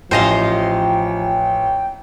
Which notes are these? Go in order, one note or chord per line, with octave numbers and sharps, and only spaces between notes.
A1 F3 C5 D#5 F5 G5 G#5 A#6